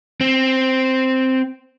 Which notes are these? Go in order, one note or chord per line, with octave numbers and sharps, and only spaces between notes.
C4